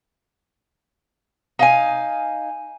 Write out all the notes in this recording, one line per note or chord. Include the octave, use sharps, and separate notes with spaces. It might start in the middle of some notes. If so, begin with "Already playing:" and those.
D#4 F5 G#5